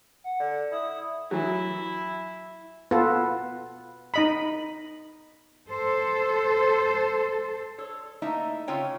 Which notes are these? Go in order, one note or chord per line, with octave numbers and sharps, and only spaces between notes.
F#5
D3
E4 D#6
E3 F#3 E4
B3 F4 A4 B4
D#4 D#5 B5
A4 C5
A4 C#5
A3 A#3 D#4 E4 D#5 E5
C#3 C4 F4 C#5 G5 G#5